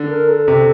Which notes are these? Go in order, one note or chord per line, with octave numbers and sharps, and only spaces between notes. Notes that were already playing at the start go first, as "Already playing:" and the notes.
Already playing: D3
A#4
A4
C3